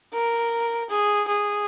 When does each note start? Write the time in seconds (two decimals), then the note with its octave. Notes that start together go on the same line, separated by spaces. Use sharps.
0.14 A#4
0.90 G#4
1.28 G#4